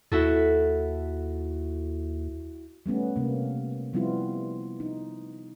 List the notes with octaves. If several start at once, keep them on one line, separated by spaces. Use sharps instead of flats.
D#2 E4 F#4 A4
G3 A3 B3 C#4
C3 A#3
F3 G3 B3 C4 E4 F4
D#4